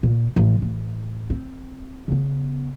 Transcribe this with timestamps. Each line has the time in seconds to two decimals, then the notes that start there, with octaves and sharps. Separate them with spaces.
0.03 A#2
0.36 A1 G#3
0.62 A1
1.30 C4
2.08 C#3 B3